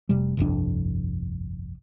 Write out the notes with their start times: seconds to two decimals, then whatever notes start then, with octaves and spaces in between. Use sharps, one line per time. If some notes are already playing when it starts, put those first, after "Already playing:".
0.09 F1 C3 G3
0.37 G1 C2 F2 D4